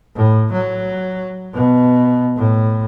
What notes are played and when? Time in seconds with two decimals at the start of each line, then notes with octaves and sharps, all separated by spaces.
0.16 A2
0.52 F#3
1.54 B2
2.37 A2